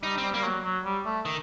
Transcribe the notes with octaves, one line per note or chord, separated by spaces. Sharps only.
G3 D#4
C4
G3
G3 A#3
F#3
F#3
G3
A3
D#3